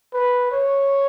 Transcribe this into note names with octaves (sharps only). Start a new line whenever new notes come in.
B4
C#5